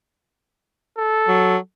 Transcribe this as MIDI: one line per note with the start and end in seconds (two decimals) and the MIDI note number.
0.98 1.57 69
1.28 1.57 54